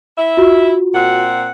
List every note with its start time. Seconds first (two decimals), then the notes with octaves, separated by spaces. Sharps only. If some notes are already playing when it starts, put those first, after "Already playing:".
0.18 E4 E5
0.37 F4 F#4
0.94 A#2 C4 F#5